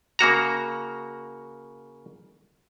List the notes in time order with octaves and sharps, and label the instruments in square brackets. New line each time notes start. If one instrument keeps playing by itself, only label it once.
[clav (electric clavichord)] C#3 A#3 F#4 A#5